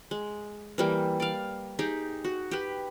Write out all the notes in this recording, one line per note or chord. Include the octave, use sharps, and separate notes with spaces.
G#3
E3 G3 A#3
D5 F5
D#4 G4 G#4
F#4
G4 B4